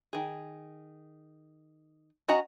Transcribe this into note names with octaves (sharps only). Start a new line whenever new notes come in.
D#3 G#4
C#4 F#4 D#5 F#5 A#5